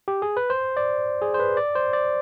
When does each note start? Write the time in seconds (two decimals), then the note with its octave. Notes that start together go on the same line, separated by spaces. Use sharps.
0.08 G4
0.22 G#4
0.37 B4
0.50 C5
0.77 D5
1.22 G#4
1.34 C5
1.40 B4
1.57 D5
1.75 C5
1.93 D5